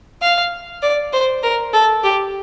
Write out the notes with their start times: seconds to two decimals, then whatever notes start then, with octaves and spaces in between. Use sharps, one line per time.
0.22 F5
0.82 D5
1.13 C5
1.43 A#4
1.73 A4
2.03 G4